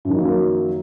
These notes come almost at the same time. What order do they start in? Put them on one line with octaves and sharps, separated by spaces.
F#2 D#3 F3 A#3 F#3